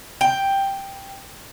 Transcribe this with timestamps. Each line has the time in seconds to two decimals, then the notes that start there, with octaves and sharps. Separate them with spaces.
0.21 G5